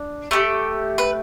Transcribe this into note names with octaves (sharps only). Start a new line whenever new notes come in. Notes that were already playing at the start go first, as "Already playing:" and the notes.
Already playing: D4
A3 D4 G4
B4